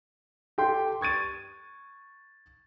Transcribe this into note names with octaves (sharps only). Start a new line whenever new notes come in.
G4 A4 G5 C6
C#6 G#6 A6 D#7